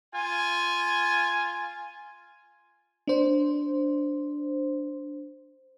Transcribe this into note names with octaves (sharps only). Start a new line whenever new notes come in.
F4 G#5
D4 C5